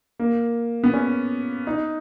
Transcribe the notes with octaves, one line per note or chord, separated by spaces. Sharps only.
A#3
B3
C#4
D#4